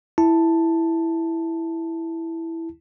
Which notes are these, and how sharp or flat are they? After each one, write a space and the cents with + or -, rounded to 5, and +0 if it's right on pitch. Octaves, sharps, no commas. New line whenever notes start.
E4 +0 A5 +5